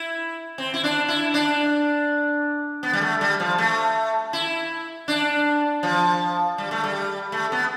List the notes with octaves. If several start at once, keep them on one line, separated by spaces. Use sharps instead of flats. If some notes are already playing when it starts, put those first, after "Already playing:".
Already playing: E4
C4
E4
D4
E4
D4
B3
G3
A3
G3
F3
A3
E4
D4
F3
G3
A3
G3
A3
B3